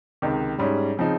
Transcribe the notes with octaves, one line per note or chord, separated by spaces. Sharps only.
C#2 C3 D#3
G#2 G3 C#4
C#3 F3 C4 D#4